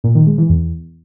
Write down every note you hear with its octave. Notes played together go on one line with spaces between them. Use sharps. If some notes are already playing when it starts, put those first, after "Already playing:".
A#2
D#3
G#3
E3
E2